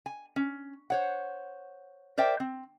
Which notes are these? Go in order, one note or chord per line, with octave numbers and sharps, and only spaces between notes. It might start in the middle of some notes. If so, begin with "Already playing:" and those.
G#5
C#4
C5 C#5 F#5
A#4 C5 D5 E5 G5
C4